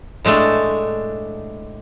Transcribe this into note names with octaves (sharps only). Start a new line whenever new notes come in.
A2 G#3 A3 D4